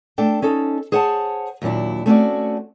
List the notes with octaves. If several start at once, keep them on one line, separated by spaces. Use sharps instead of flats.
A3 D4 A4 G5
C#4 D#4 A4
G#4 C5 C#5 F#5 G5 A5
D#2 A#2 F#3 D4 E4
A3 C4 C#4 E4 F#4 D5